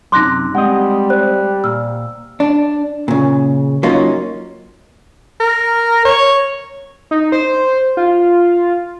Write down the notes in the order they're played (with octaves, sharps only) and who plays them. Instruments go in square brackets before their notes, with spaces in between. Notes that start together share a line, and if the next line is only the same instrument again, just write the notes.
[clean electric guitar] F#2 C3 [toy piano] D#4 C6 [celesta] D6 F#6 A#6
[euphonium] G3 [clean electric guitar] G#3 C4 D#5 [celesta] F#5
[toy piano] C5 [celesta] F#6
[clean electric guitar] A#2 [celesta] E6 F6
[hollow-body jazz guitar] D4
A#2 C#3
F#3 A#3 C#4 D#4 F4
[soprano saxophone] A#4
C#5
[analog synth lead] D#4
C5
F4